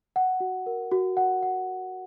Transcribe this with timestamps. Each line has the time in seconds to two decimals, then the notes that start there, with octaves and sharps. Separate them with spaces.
0.16 F#5
0.40 F#4
0.66 A#4
0.91 F#4
1.17 F#5
1.43 F#5